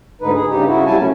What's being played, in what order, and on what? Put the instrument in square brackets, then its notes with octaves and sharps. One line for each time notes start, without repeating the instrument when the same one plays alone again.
[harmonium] D2 G#2 D3 D#4 B4
G#4
G2 C#3 D#4 G4
C#3 E4 F#4
C3 F#3 G3 E4 G#5 A5
A3 A#3 C#4